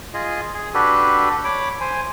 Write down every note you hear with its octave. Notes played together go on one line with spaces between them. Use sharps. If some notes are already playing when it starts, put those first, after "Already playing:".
F4 G#4 D#5
G#4
D4 F#4 G4 A4 B4
C#5 B5 D6
C5 G#5